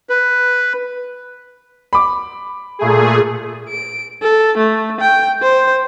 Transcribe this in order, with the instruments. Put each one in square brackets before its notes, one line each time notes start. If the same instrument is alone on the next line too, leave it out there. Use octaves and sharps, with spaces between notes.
[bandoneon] B4
[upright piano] B5 D6
[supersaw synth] A#2 A3 G#4
[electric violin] D7
A4
A3
G5
C5